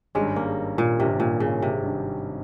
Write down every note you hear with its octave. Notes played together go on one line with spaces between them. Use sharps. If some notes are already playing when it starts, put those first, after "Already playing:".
G#1 G2 G3 G#3 C#4
A#3
A#2
G#1 G2 C3 G3 C#4
A#2
C#3
C3
G#1 G2 G3 C#4